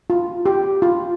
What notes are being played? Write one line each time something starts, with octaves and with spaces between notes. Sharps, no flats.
F4
G4
F4